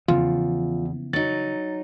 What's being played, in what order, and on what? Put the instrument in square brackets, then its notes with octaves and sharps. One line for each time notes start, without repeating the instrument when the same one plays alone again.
[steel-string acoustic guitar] E2 [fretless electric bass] C#3 E3 F3 [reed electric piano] F4
[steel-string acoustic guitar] F#3 D#4 [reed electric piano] A6